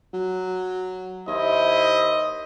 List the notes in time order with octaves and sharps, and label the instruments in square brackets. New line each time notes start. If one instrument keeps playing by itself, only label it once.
[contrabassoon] F#3
[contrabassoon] D#2 [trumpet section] E4 C5 E5 [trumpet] D#5